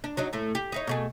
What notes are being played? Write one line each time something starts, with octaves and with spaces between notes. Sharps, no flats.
D4
F#3 D4 D#4
A2 A3
G4
D#4 E4 C#5
B2 A3 G#4